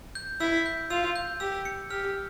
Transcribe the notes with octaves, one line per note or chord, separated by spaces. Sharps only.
G6
E4 E6
G6
F4 E6
G6
G4 E6
C#7
G4 F6